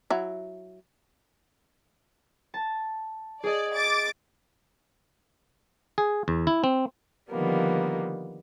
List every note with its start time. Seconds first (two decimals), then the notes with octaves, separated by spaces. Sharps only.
0.10 F#3 E4
2.54 A5
3.44 G#4 D5 D#5
3.75 D6 A6
5.98 G#4
6.28 E2
6.47 E4
6.64 C4
7.30 D3 D#3 F3 G3 A#3 B3